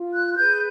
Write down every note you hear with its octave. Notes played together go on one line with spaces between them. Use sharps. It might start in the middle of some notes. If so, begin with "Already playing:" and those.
Already playing: F4
F#6
F#6
G#4 B4 G6